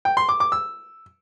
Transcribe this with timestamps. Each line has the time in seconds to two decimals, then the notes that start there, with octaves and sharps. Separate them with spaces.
0.05 G5
0.17 C6
0.29 D6
0.40 D6
0.52 E6